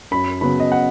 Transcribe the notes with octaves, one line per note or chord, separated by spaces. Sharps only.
F#2 B5
C#3 F#3 B3 B5
D#5
F#5